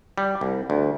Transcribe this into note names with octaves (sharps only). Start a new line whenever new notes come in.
G3
C2
D2